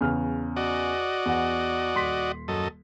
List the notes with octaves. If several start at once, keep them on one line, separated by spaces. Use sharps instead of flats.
E2 C#3 F6
F#4 D5 D#5
E2 F#5
D#1 C6 B6
F#2 A4 D#5